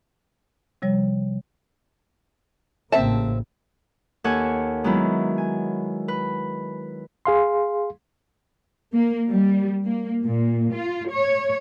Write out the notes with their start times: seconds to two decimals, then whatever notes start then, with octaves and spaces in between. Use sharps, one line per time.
0.82 C3 F3 G3 C#5
2.92 A1 C#3 A#3 C4 E5 A5
4.24 D#2 A4 C#5 F#5 G#5
4.84 D#3 F#3 G#3 B3 E4
5.38 G#5
6.08 B4
7.25 G#4 F5 C6
8.93 A#3
9.28 G3
9.84 A#3
10.23 A#2
10.72 F4
11.10 C#5